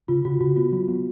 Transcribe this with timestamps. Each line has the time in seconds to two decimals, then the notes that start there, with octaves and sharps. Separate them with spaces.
0.08 C#3 F4
0.25 C#3 F#4
0.41 C#3 F#4
0.56 B3 F4
0.72 F#3
0.88 B3